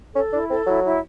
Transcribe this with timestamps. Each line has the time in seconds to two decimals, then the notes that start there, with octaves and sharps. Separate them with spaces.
0.15 C#4 A4
0.33 D4 E4
0.49 C4 A4
0.66 F#3 E4
0.84 E4